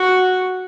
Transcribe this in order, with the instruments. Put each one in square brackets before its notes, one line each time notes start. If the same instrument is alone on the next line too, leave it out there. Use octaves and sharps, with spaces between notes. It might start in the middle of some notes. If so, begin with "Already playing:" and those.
Already playing: [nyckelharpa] F#4